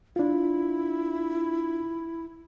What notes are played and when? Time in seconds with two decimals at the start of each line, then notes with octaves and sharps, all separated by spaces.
0.16 D4 E4 F4